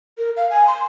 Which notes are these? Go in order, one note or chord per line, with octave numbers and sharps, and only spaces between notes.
A#4
F5
G#5
C6